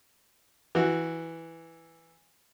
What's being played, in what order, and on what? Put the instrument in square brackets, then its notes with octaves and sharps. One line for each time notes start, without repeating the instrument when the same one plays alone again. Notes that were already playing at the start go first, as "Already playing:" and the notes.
[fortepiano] E3 F#4